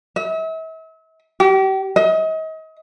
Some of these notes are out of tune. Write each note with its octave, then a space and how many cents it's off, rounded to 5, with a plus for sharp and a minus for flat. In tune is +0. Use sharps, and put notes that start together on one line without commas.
E5 -40
G4 -35
D#5 +35